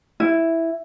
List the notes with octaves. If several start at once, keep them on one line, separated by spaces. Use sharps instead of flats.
E4